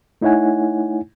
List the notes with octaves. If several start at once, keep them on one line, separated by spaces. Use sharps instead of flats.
A3 D#4 E4 C#5 F#5 G#5